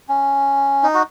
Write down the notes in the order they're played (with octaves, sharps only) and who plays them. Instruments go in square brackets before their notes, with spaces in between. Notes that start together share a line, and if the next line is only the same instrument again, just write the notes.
[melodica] C#4
D#4
F#4